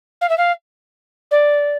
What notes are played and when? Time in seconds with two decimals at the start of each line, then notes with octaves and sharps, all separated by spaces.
0.21 F5
0.29 E5
0.38 F5
1.31 D5